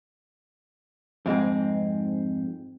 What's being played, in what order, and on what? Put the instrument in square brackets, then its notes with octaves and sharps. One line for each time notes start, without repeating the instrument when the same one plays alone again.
[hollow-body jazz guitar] F2 G#2 G#3 C4